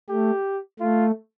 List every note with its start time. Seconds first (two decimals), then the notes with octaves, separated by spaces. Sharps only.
0.09 A3 G4
0.79 A3 F4